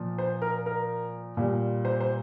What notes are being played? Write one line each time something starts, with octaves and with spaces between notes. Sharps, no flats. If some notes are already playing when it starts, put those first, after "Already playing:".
Already playing: A#2 F3
C5
A#4
A#4
A#2 G3
C5
C5